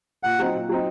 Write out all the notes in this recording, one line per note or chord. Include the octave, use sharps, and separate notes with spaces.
A#2 F#5
F#3 C4 D#4
A#2
F#3 C4 D#4